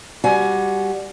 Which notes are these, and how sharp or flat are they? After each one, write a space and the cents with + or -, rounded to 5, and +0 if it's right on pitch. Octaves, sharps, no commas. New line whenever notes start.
G3 +0 F#4 +0 G#5 +20